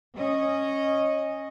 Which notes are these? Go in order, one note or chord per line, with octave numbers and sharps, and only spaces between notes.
C#4 D#5